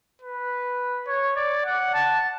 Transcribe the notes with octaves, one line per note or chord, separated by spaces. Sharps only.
B4
C#5
D5
F#5
A5